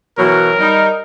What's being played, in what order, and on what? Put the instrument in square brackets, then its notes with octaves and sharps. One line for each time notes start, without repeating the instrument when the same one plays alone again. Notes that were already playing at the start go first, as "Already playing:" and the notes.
[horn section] B2 E3 F#3 [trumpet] A#4
[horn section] G3 D#4